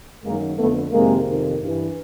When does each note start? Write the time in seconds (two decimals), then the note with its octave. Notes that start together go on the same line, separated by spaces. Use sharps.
0.24 F#2 D#3 G#3 A#3
0.58 F2 D3 A3 B3
0.92 F2 C3 D#3 G#3 A#3
1.27 F2 C3 D#3
1.61 G2 E3